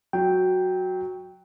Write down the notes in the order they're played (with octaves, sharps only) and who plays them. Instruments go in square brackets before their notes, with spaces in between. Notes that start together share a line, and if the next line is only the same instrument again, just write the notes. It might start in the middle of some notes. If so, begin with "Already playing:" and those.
[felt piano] F#3 [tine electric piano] G5